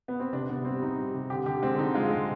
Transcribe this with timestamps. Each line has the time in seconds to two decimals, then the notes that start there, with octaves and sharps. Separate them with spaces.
0.08 B3
0.20 C4
0.33 C3 D4
0.49 C3 B3
0.65 G3 C4
0.82 C3 D#4
0.98 G3
1.14 C3
1.30 D3 G4
1.46 D3 G4
1.62 G#3 C4
1.78 D3 D#4
1.94 G#3 F4
2.10 G#3